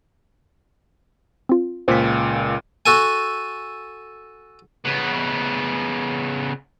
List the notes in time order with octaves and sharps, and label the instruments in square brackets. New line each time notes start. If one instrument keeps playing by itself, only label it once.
[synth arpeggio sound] C4 F4
[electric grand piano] C#2 A#2 [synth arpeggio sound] C5 B6
[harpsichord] F#4 A4 G#5
[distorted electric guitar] C#3 B3